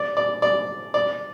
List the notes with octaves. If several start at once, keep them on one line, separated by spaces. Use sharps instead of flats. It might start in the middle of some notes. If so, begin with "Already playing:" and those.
Already playing: D5
D5
D5
D5